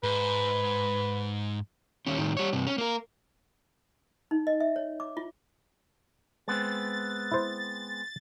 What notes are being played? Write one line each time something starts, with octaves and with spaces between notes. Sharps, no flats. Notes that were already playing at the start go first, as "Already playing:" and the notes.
G#2 B4
D#2 C#4
A2 D#3
G3 C#5
G2 C3
C#4
A#3 A#4
D#4
D#5
E5
C#5
D6
F4
G#3 B3 C4 A6
E4 C5